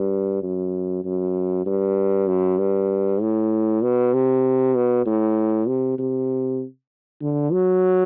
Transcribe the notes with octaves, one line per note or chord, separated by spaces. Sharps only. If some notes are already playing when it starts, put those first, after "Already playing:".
Already playing: G2
F#2
F#2
G2
F#2
G2
A2
B2
C3
B2
A2
C3
C3
D3
F#3